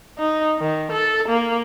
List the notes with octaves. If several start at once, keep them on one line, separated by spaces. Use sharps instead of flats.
D#4
D#3
A4
A#3